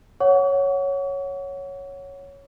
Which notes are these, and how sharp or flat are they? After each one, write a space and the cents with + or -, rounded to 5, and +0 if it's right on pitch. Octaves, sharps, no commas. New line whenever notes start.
C#5 +0 F#5 -5 C#6 +40